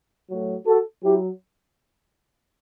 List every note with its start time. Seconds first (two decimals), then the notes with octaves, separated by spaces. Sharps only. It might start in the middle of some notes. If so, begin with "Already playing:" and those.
0.30 A2 F#3
0.66 F#4 A4
1.02 F#3 E4 G4